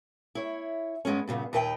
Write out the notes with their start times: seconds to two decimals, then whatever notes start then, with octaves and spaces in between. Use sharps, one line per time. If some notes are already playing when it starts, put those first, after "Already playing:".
0.35 E4 C#5
1.05 G2 G#3 B3 C#4
1.28 G2 A#2 C#3 B3
1.53 D#2 A#2 D#4 B4 F#5 G5